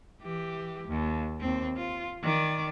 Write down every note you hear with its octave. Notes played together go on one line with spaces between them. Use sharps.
E3 G4
D#2
D#2 C4
F4
D#3 D5